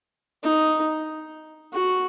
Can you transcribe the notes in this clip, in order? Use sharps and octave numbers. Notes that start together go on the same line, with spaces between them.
D#4
F#4